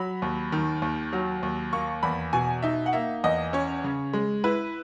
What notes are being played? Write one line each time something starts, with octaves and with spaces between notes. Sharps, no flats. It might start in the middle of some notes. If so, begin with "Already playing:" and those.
Already playing: F#3 B5
D#2
D#3
D#2
F#3
D#2
A#3 C#6
E2 B5
B2 G#5
D#4 E5
F#5
A#3 E5
E2 D#5
C#4 C#5
C#3
G#3
E4 B4